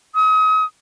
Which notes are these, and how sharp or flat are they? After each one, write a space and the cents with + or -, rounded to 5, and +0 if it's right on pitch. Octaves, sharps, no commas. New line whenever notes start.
D#6 +35